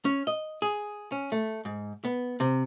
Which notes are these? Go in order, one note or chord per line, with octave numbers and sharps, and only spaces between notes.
C#4
D#5
G#4
C#4
A3
G#2
B3
C3